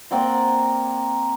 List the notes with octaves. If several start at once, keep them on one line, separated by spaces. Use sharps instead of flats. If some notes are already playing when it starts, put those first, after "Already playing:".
A#3 C4 D5 F#5